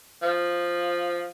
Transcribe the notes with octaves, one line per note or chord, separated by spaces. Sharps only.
F3